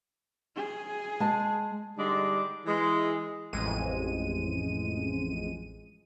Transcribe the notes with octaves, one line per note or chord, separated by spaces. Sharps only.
G#4
G#3 A5
D3 G3 G#3 D4 D#4
E3 G#3
A1 F2 G#3 D#7